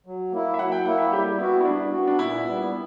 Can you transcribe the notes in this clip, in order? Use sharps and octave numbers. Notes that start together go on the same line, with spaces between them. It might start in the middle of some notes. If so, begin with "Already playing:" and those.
F#3
A#3 E4
E5
F#3 F#5
G5
A#3 E4 F#5
E5
G3 G4
B3 E4 F#4
E4
G3 D4
B3 F#4
D4
A#2 E4
G3 B3